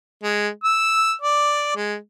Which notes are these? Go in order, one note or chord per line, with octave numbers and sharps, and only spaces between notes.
G#3
E6
D5
G#3